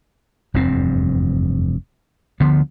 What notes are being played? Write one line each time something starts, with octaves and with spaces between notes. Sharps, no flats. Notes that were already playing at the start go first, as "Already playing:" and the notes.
F1 E2 G2 C4
D2 D3 F3 B3